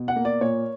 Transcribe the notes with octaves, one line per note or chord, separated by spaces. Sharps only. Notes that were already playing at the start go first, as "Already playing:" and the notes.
Already playing: B2
F#5
A#3
D5
A#2 C#5